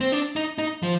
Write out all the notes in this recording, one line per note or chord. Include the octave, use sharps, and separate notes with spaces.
C4
D4
D#4
D#4
F3